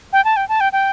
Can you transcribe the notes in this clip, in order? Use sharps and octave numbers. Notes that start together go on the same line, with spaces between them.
G5
A5
G5
A5
G5
G5